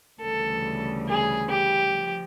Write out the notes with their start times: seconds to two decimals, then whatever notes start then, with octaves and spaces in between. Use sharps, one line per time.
0.21 D2 C#3 E3 G3 A4
1.07 G#4
1.49 G4
1.93 F3